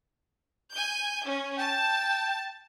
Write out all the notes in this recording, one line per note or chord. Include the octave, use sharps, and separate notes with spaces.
G#5 G6
C#4
G5 A5